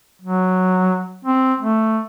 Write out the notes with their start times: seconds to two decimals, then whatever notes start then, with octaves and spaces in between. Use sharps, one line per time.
0.22 F#3
1.25 C4
1.60 A3